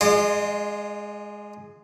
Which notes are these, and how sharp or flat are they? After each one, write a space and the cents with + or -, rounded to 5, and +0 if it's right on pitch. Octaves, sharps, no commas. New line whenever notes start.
G#3 +0 F4 +0 D#5 -45